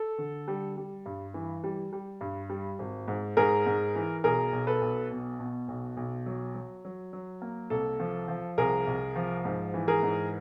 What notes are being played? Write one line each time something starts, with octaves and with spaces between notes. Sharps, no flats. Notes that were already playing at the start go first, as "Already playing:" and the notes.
Already playing: A4
D3
G3
G3
G2
E3
G3
G3
G2
G3
G#1
G#2
G#2 G#4 A#4
G#2
E3
B1 G#4 A#4
B1
A4 B4
B1
B2
B2
B1
B1
F#3
F#3
F#3
F#3
A#3
C2 A4
F3
F3
C2 G#4 A#4
C2
F3
G#2
E3
G#4 A#4
G#2